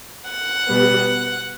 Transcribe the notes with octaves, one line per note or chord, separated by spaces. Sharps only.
F#5
B2 G3 B3